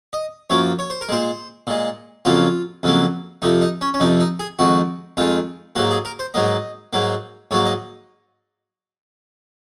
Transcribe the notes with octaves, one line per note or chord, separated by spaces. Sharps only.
D#5
F#2 F3 A#3 C#5
C#5
C5
A#4
A#2 G#3 C5
A#2 G#3
F2 C#3 F#3 A#3 F4
F2 C#3 F#3 A#3
F2 C3 F3 D#4
D#4
C#4
C#4
F2 C3 F3 D#4
D#4
G#4
F2 D#3 G#3 F#4
F2 D#3 G#3 F4
G#2 F#3 A#3 F#4
G#4
A#4
C5
G#2 F#3 A#3 D#5
G#2 F#3 A#3
G#2 F#3 A#3 C#5
D#5